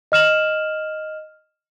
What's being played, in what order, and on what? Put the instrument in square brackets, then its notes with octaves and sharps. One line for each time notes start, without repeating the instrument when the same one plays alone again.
[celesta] D#5 F6 E7 F#7